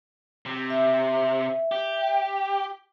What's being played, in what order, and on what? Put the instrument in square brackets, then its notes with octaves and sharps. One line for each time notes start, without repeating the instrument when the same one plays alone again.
[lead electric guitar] C3
[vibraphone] E5
[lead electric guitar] G4